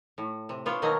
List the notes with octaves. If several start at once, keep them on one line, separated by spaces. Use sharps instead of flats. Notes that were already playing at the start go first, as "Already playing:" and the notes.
A2
C3
B3 D4 F4 C#5
B2 D#3 F#3 A#3 D#5